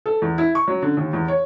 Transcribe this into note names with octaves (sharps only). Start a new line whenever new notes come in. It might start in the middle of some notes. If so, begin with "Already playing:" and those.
A4
E2
E4
C#6
F#3
D3
D#2
E2
C#5